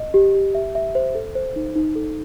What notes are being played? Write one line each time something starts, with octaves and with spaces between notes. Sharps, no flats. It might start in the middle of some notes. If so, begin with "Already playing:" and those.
Already playing: D#5
G4
G4
E5
E5
C5
A4
C5
D#4
D#4
A4